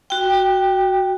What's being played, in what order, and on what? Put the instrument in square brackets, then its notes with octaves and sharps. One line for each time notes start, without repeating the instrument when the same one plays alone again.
[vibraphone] F#4 G5